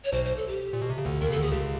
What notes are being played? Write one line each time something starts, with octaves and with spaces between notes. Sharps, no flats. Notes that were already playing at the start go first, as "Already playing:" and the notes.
C#5
B1 B2 C5
C5
A4
G4
A#2
B2
C3
C#3
D2 D3
D#2 D#3 A#4
C#3 A4
D2 D3 G#4
C#2 C#3 G4